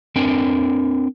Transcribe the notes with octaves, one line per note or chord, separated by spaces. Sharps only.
C4 D4 A#4 G5 G#5